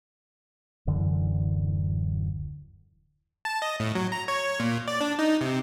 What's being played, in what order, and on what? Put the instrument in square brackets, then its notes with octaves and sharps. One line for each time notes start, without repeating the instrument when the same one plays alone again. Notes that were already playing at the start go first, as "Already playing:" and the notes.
[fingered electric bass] D1 F#2 D3 E3
[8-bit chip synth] A5
D#5
A2
F#3
A#5
C#5
A#2
D5
D4
D#4
C3